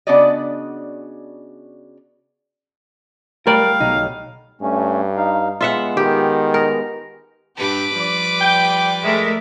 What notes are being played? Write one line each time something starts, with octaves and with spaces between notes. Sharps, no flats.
C#3 B3 D4 F#4 D5 D#5
G3 A3 A#4 D5 F5
B1 D#4
G2 A3 C#4
D#4 F5
G#3 B3 F4 E5 F#5
D#3 G4
A#4
G2 D4 G4 B4 D6
F3 G3 D5
G5
G#3 A3 A#4 E5